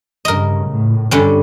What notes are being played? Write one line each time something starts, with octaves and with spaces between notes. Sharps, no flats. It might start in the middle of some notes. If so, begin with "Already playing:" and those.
G2 C#3 A#4 D#5
A2
G2 D3 G3 C#4